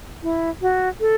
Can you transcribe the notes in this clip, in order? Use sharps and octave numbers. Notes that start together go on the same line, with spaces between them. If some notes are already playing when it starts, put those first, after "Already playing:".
E4
F#4
A4